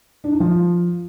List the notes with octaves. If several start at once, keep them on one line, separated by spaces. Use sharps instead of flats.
D4
D#4
F3